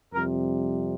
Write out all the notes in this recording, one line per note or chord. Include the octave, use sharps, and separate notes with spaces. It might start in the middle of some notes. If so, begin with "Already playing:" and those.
F2 C3 G3 A#4